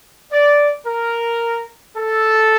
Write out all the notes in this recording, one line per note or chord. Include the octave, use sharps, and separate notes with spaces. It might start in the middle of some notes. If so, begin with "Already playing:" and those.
D5
A#4
A4